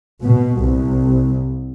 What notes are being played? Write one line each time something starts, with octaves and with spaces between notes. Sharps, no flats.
B2
C2